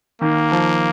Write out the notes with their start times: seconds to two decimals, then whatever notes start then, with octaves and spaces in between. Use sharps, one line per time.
0.22 D#3 A#3
0.52 F3